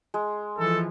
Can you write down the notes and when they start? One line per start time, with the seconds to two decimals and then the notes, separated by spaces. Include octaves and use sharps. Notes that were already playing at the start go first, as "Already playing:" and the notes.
0.14 G#3
0.58 E3 F3 A4